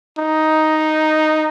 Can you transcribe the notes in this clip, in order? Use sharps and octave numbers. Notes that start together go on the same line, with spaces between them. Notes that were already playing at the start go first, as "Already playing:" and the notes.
D#4